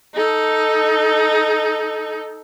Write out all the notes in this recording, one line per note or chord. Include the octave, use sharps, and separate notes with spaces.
D#4 A4